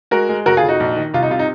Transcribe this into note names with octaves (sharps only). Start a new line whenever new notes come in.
G#3 F#4 A#4
G#3
F1 F#4 A#4
F4 G#4
F1
D#4 F#4
A#1
D#3
C2 F4
D#4
C3 F4
D#4